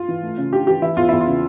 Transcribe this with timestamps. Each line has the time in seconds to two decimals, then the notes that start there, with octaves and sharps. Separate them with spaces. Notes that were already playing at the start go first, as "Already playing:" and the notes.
Already playing: F4
0.08 E3
0.23 A3
0.38 C#3
0.52 D4 G4
0.67 E3 G4
0.82 E3 E4
0.97 E2 F4
1.09 E2 E4
1.21 F4
1.27 C#3